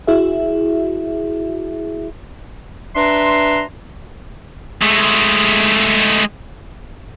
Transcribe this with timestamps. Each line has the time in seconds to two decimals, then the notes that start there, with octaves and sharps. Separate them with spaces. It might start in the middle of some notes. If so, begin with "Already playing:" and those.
0.07 E4 F#4 G#4 E5
2.96 D4 B4 E5 A#5 C6
4.82 G#3 A3